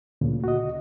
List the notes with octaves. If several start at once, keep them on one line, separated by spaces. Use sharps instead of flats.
D2 A#2 C#3
F#4 D#5